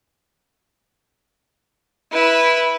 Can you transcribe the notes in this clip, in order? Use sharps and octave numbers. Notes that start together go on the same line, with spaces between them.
E4 B4